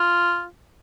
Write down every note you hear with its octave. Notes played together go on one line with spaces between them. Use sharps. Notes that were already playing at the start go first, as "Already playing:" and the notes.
Already playing: F4